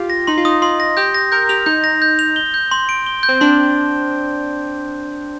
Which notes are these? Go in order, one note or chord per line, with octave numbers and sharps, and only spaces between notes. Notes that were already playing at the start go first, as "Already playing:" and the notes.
Already playing: F4 G4
A#6
D#4 C6
F4
D#4 D#6
F4 C6
A#6
G4 G6
A#6
A#4 G6
G4 F7
D#4 G6
A#6
G6
F7
G7
G6
C6
D7
G7
G6
C4
D4 C6